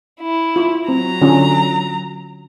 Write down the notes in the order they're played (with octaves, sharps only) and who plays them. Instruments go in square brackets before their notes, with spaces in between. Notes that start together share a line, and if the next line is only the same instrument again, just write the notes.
[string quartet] E4
[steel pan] F4
[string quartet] F#3 A#5 [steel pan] C4
[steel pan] D3 C#4 F4